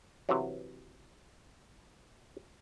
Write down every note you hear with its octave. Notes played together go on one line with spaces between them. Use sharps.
C3 E3 F#3